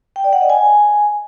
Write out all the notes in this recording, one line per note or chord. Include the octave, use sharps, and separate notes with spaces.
G5
D5
F#5
D#5
G#5